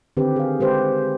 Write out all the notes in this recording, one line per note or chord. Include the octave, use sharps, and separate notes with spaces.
D3 D#3 C4 G4 B4
G#4 F5
G#3 G4 B4 C5